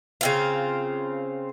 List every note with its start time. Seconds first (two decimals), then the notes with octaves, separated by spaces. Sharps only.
0.21 C#3 C4 F4